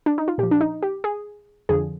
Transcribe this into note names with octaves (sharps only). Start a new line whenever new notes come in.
D4
D#4
F4
A#2 F3 G4
D4
D#4
G4
G#4
F2 D3 F3 G#4